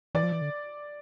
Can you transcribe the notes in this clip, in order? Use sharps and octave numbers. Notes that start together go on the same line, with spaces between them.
E3 D5
F3
E3
D3